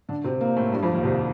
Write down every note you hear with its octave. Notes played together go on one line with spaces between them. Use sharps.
D3 D4
C3 C4
A#2 A#3
A2 A3
G2 G3
F2 F3
D#2 D#3
C2 C3